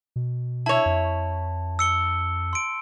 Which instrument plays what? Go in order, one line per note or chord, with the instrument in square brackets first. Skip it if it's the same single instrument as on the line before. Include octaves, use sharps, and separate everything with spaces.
[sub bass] B2
[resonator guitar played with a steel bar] E4 C#5 [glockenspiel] A5
[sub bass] F2
[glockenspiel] E6 C#7 G7
C6 D7